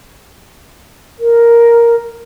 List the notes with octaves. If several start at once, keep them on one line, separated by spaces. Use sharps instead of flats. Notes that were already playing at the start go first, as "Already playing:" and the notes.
A#4